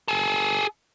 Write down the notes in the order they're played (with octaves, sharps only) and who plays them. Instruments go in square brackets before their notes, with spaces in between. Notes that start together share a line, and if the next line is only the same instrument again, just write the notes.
[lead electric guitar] G#4 A4